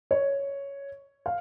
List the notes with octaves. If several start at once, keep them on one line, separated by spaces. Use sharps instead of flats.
C#5
F5